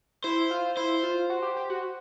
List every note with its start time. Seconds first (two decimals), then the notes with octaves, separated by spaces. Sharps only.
0.24 E4 C5
0.51 F4
0.77 E4 C5
1.03 F4
1.30 F#4
1.42 G4
1.57 G4
1.70 F#4